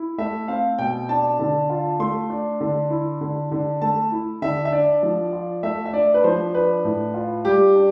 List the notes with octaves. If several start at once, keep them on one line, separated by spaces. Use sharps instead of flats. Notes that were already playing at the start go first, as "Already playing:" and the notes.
Already playing: E4
A3 E5
C4 F5
B2 G5
D4 A5
D3
F4
A3 C6
D4
D3
E4
D3
D3
A3 A5
E4
D3 E5
E5
D4 D5
F3
F4
A3 E5
E5
D4 D5
B4
F3 C5
D4 B4
A2
F4
G3 G4
D4